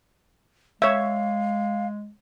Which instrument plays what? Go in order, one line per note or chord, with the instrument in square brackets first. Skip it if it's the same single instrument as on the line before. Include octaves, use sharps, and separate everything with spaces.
[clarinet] G#3 [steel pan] C#5 E5 [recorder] F5